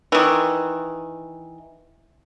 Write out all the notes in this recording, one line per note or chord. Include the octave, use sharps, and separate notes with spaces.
D#3 E3